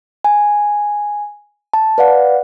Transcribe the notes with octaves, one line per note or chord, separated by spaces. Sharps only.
G#5
A5
B4 D5 F5 F#5